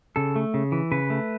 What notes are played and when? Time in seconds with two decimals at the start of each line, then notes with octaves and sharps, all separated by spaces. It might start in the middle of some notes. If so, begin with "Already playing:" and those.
0.16 C#3 A4
0.36 A3
0.54 C#3
0.72 E3
0.92 C#3 B4
1.10 A3